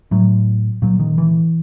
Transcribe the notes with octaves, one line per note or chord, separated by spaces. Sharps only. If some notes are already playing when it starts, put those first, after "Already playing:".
A2 F#3
A#2 F#3
D#3
E3